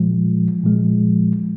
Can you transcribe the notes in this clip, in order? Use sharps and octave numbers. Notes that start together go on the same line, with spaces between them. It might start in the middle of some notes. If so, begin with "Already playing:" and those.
Already playing: A#2 F3 G#3
A#2 F3 G#3